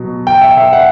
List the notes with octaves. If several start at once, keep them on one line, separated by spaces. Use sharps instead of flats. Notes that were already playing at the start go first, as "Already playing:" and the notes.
Already playing: B2 F#3
G5
E5
E5
F#5